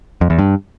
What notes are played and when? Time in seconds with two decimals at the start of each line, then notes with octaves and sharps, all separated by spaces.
0.21 F2
0.30 E2
0.39 G2